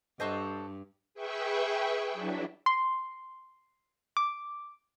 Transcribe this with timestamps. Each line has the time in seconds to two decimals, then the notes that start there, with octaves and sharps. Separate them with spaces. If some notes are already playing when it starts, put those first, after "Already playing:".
0.20 G2 F#4 A4 C5 D#5 E5
1.14 G#4 B4 E5 G5 C#6
2.12 F#3 D4 E4
2.66 C6
4.17 D6